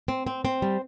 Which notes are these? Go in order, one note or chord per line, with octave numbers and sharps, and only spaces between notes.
C4
C4
C4
G3